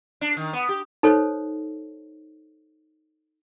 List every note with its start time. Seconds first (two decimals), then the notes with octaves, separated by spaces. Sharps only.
0.21 D4
0.36 D#3
0.53 B3
0.69 G4
1.03 D#4 A4 C5 C#5